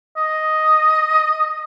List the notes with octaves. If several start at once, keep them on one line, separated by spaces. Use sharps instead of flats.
D#5